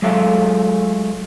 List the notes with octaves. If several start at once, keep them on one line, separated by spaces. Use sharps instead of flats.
F#3 G#3 A3 F4 A4 E5